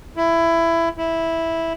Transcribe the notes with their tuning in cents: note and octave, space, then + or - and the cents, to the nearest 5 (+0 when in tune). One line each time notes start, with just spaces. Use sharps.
E4 +15
E4 -5